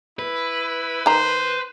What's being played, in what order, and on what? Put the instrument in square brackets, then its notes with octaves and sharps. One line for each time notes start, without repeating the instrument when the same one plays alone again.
[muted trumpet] E4 [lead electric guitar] B4
[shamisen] D#3 A#5 [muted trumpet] C5